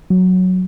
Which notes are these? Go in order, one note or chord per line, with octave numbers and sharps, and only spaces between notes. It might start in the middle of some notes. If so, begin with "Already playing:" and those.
F#3